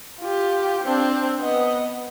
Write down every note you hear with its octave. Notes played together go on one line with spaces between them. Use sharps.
F4 G4
C4 D4
B3 D#5